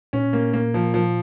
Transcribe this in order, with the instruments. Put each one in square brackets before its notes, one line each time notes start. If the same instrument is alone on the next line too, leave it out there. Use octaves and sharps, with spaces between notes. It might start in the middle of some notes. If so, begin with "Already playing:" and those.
[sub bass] A#2 [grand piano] C#4
[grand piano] A#3
A#3
F3
F3